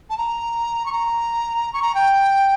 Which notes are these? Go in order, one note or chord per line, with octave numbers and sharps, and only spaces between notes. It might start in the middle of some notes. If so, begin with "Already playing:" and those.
A5
A#5
C#6
A#5
C#6
A#5
G5